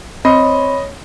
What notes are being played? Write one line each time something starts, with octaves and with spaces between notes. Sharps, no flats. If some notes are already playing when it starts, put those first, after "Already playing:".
C4 C#5 D#5 B5